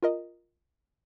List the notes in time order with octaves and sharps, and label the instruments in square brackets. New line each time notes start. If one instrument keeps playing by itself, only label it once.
[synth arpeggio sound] F4 A#4 D#5